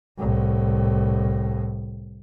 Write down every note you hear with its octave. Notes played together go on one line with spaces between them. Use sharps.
C2 A2